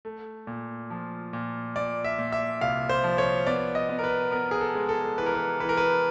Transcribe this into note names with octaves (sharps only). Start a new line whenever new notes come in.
A3
A#2
F3
A#2
A#2 D5
E5
A#2
E5
C2 F5
C5
F3
C#5
B3 D5
D#5
B3
A#4
B4
B3 A#4
G#4
A4
G#3
A4
E3 B4
A#4
B4
E3 B4
A#4
B4